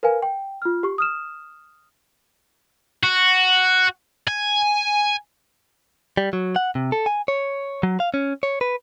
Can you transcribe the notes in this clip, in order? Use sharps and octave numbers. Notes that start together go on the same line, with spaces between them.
A#4 B4 F5 G#5
G5
F4 F6
G4 C#6
D#6 F6 E7
F#4
G#5
G3
F#3
F#5
C3
A4
G#5
C#5
F#3
F5
C#4
C#5
B4